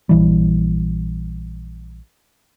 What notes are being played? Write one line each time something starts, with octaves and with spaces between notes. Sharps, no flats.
A#1 E3 G3